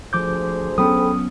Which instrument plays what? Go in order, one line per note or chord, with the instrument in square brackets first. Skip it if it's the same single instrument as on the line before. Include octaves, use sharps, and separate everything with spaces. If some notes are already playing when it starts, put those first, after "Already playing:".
[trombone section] D2 G#4 C5 [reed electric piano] F3 D6 G6
[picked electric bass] F#3 B3 C#4 [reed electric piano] A4 G5 B5 [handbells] D#6